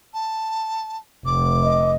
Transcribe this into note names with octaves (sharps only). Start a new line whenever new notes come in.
A5
F1 D6
D#5